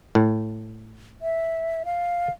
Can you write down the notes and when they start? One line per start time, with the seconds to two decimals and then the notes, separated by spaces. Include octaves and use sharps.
0.15 A2
1.22 E5
1.85 F5